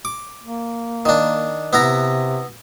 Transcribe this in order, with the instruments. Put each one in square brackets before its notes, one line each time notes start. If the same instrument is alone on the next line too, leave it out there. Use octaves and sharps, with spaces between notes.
[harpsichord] D6
[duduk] A#3
[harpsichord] D#3 D4
[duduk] C3 [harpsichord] B3 E4 A#5